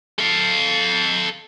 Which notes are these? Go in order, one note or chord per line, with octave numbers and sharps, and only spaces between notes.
A4 F5